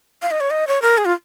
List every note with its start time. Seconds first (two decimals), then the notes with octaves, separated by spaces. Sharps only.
0.22 F5
0.31 D#5
0.40 C#5
0.50 D#5
0.68 C#5
0.82 A#4
0.98 G#4
1.05 F4